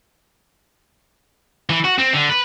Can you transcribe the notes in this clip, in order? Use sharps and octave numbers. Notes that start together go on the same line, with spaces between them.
E3
F#4
C4
D3
B4